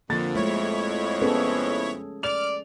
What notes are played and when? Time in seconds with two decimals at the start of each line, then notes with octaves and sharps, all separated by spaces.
0.10 F2 D3 F3 A#3 A6
0.35 G#3 A3 E4 C#5
1.22 B3 C#4 G#4 A4
2.23 D5 F6 F7